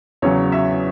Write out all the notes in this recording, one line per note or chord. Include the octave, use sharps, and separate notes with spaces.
E2 C#3 F#3 C#5
E5